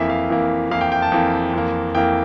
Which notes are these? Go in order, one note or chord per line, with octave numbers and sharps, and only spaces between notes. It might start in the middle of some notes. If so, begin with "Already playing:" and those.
Already playing: F2 E3 A#3 E5
F5
F2 E3 A#3
F2 E3 A#3 F5
G5
G5
A5
F2 E3 A#3
F2 E3 A#3
F2 E3 A#3 G5